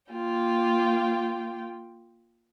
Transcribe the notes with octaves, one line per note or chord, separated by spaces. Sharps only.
A#3 F4 G5